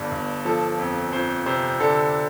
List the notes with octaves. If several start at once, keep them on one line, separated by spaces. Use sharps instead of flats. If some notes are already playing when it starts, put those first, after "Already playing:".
Already playing: G1 G2
G1
F3 A4
F2
F2 C5
C3 C5
D3 A4